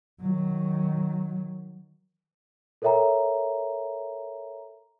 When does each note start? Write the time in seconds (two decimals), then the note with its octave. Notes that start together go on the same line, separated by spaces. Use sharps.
0.21 D#3 F#3
2.82 A4 A#4 C#5 E5 G5 A#5